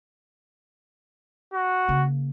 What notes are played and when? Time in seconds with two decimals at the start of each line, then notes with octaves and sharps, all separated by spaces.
1.54 F#4
1.89 C#3 A#3